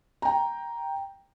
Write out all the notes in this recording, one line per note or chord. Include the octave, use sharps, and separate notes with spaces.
G5 A#5